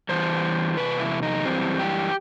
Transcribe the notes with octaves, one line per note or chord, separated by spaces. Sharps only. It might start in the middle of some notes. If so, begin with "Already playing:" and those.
E2 C3 E3 G3 C5
E2 C3 B4
E4
D#4
F#2 E3 G3 C4
G4